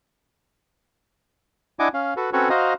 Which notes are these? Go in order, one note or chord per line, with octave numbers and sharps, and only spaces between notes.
D4 E4 D#5 F#5 G#5 D6
C#4 F5
F#4 A4 B4
C4 C#4 F#4 A4 B4 C#5
F#4 C5 D#5 F5 A#5